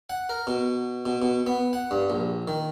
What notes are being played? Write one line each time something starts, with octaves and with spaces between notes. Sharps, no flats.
F#5
A#4
B2
B2
B2
B3
F#5
G2
A#1
D#3